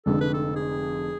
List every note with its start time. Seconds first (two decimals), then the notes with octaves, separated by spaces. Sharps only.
0.06 F1 F2 D3 G#3 D4 A4
0.21 B4
0.34 A4
0.56 G#4